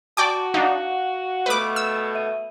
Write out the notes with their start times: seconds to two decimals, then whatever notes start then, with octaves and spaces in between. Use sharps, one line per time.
0.17 F#4 D5 G5 A5 C#6 D6
0.54 D4 D#4 F5 F#5
1.46 B2 A3 B4 D6
1.76 E6
2.15 E5 D#7